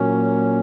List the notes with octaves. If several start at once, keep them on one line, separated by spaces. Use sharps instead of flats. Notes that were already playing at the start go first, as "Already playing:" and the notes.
Already playing: A#2 F#3 A#3 C#4